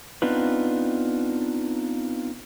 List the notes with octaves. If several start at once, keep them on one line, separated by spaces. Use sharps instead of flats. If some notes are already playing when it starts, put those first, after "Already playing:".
B3 C4 D4 D#4 F4 B4